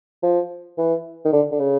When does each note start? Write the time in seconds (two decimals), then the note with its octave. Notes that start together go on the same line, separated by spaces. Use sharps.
0.23 F3
0.78 E3
1.25 D#3
1.32 D3
1.52 D3
1.59 C#3